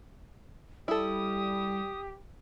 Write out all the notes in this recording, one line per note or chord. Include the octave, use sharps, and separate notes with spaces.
G3 E4 G4 A4 D#6